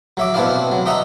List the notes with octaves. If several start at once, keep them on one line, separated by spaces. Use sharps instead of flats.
F#3 E5 D6
B2 C4 D4 E4 D5 F5
F#3
D4 D#5 E5 F#5 A#5